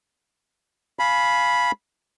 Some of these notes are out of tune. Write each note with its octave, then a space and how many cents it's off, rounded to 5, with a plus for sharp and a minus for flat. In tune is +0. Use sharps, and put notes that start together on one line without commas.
F5 +0 G#5 +25 B5 -5